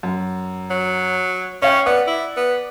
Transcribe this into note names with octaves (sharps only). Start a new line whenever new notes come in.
F#2
F#3
C#4 C#5 F5 G5
B3 D5 F#5 D6
E4
B3